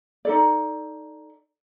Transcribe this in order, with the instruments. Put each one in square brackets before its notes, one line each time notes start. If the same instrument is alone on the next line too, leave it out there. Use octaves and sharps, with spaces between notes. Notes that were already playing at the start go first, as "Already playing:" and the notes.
[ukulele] D#4 A4 D5